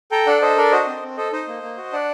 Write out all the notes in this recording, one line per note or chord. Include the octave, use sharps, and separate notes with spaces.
A4 G5 A#5
D4 D5 F#5
A4 C5 D#5
D4 A#4 D5
F#4 C5 D#5
C4
C4
A4 C5 D#5
D#4 C5 D#5
A#3
A#3
F#4
D4 D5 F#5